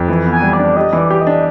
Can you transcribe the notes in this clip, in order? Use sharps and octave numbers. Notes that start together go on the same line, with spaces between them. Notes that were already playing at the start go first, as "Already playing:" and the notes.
Already playing: F2
E3
B3
G#5
G3
D5
D4
G4 D#5
E3
D5
G4
D#5
D4